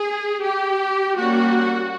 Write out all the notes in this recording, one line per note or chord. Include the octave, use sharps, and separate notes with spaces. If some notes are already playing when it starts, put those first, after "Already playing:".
Already playing: G#4
G4
G3 A#3 C#4 F#4